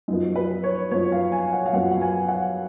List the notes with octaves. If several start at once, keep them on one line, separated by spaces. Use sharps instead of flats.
F#2 F3 B3 D#4
B4
C#5
F#2 F3 B3 C#5
F5
G#5
F#5
F5
F#2 F3 B3 F#5
F#5
G#5
F#5